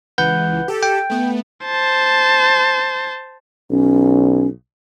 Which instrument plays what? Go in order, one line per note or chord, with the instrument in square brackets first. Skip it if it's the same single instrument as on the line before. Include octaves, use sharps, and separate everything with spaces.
[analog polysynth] C#2 E3 [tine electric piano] B4 F#5 G6
[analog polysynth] G4 A4
[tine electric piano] G5
[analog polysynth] A3 B3
[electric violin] C5 A5
[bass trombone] B1 [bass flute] C#4